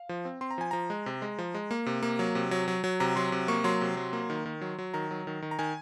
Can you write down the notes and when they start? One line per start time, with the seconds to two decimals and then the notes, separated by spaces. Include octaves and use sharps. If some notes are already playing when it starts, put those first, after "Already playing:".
Already playing: F5
0.09 F3
0.25 C4
0.41 C4 C6
0.51 A#5
0.58 F3 G#5
0.71 F3 A#5
0.90 G#3
1.06 C3
1.22 G#3
1.39 F3
1.54 G#3
1.71 A#3
1.86 C3
2.03 A#3
2.19 F#3
2.35 C3
2.51 F#3
2.68 F#3
2.84 F#3
3.00 C3 A#5
3.16 F#3 C6
3.32 C3
3.48 A#3 C#6
3.64 F#3 C6
3.81 C3
3.97 F#3
4.13 A#3
4.30 D#3
4.46 D#3
4.61 F#3
4.79 F#3
4.94 D#3 A#5
5.11 F#3
5.27 D#3
5.42 D#3
5.51 A#5
5.59 D#3 G#5